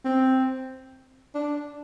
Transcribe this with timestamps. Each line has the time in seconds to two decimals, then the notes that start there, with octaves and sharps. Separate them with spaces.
0.05 C4
1.34 D4